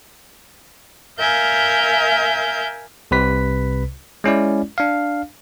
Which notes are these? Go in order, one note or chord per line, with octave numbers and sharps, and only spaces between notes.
A#4 E5 F5 G#5 G6
C2 C3 B4 B6
G#3 C#4 E4 D5
D4 F5